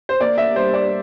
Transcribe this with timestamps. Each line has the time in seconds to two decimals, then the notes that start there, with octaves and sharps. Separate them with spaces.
0.09 C5
0.20 A#3 D5
0.38 E5
0.56 G2 C5
0.73 D5